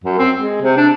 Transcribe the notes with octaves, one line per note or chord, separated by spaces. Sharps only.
F#2
C4
G#3
C3
D4